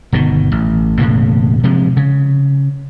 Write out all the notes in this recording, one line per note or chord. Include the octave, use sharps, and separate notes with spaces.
G1 B2 D#3
A1
E1 A2 C#3 A#3
C3 F3 G#3
C#3